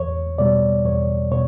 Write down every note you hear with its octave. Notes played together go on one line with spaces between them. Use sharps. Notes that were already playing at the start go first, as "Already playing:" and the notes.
Already playing: E2 C#5
B2 G3 D5
E2 C#5
B2 C#5